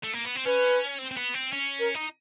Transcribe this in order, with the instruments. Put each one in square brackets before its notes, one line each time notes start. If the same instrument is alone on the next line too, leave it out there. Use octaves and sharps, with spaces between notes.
[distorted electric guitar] A3
A#3
B3
C4
[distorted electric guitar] C#4 [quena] B4
[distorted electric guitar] C4
C4
B3
C4
C#4
[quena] A#4
[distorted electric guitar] D#4